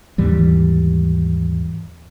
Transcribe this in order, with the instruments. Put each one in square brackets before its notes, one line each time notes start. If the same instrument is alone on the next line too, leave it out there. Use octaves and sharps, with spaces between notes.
[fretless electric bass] D#2 G#2 E3 G3